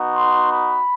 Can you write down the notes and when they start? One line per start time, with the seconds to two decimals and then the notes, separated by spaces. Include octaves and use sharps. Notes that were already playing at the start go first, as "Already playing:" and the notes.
Already playing: B3 D#4 F#4
0.13 C6
0.50 B5